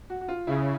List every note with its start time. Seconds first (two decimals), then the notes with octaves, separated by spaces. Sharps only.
0.10 F#4
0.21 F#4
0.28 F4
0.47 C#3 E4